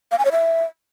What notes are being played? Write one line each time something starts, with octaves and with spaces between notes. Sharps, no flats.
F5
G#5
C#5
E5